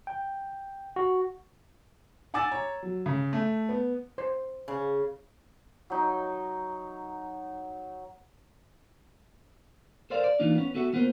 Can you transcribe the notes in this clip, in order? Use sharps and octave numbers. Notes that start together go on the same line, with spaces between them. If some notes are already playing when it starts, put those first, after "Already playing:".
G5
F#4
F#5 G#5 D6 E6 A6
C#5 A#5
F#3
C#3
A3
B3
C5
C#3
F#3 D#4
A4 A#4 C5 D5 F5
D5
E3 A#3 D4 D#4 F4
B3 C#4
B3 F#4 A4 E5 F#5
A#3 B3 F4 A#4 C5